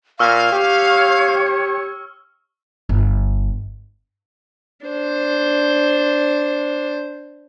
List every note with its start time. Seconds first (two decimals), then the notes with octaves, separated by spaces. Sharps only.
0.19 A#2 F5 C#6 E6 F6
0.52 G4 C#5
2.89 G1
4.86 D4 C5